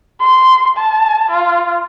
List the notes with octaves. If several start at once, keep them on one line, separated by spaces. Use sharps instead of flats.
C6
A5
F4